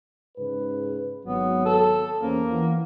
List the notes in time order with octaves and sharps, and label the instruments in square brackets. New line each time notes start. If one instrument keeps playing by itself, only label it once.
[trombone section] G#2 C#3 B4
[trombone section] G#1 F#3 [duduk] B3
[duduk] A4
[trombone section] E2 C#4 C5 [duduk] A#3
[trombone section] E3 B3